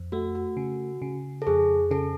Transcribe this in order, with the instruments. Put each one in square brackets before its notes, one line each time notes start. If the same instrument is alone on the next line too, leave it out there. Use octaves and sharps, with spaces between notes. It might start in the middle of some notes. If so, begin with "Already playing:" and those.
Already playing: [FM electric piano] F2
[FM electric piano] A3 [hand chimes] F#4
[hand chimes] F#4
[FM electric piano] C#3
C#3
[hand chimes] A4
[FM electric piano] F2 [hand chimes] G#4
[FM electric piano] C#3 [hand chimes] A4